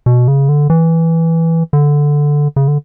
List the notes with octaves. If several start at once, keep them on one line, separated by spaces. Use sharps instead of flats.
B2
C#3
D3
E3
D3
C#3
D3